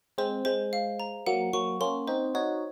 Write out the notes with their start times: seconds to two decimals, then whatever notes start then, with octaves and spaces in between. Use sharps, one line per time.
0.18 G#3 C4 C5
0.45 G#3 C5
0.73 F5
1.00 A#5
1.26 F#3 A#3 F#5
1.53 F#3 A#3 C#6
1.80 A#3 C#4 C6
2.07 C4 D#4 C5
2.34 D#4 F#4 C#5